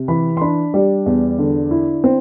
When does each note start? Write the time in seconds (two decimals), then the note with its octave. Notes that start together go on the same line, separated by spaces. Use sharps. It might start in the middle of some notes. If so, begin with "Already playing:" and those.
Already playing: C3
0.08 E3 B5
0.37 C6
0.41 D4 B5
0.74 G3 D5
1.06 E2
1.39 D3
1.71 E4
2.04 C4